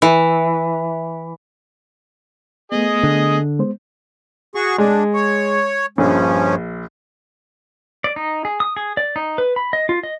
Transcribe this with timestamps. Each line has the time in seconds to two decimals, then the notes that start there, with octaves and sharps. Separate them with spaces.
0.02 E3
2.72 A3 B3 G#4 D#5
3.03 D3
3.59 G#3 B3 C5
4.55 F#4 G#4 C#6
4.78 G#3 D4
5.14 C#5
5.98 A#1 G2 F3 C#4
8.04 D5
8.16 D#4
8.45 G#4
8.60 D#6
8.77 G#4
8.97 D5
9.16 D#4
9.38 B4
9.56 B5
9.73 D#5
9.89 F4
10.03 D#5